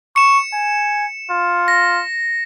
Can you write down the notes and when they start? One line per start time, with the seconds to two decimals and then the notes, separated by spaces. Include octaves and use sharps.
0.16 C#6 C#7 E7
0.53 G#5
1.30 F4
1.68 A#6